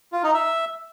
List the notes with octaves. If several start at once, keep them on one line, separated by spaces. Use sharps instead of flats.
F4
D#4
E5